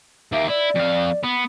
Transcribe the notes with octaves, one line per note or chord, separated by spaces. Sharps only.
D#2 A#3 E5
E4 D5
F2 F5
B3